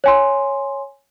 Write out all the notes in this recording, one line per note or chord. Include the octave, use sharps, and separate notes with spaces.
C#5 G#5 C6